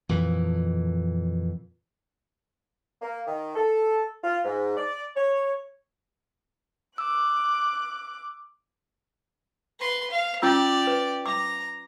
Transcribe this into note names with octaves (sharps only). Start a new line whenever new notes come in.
F2 A#2 E3
A#3
D#3
A4
F4
G#2
D5
C#5
D6 E6 F#6
B4 C6
F5
C#4 F4 G4 D5 E6
B4
A#5 D6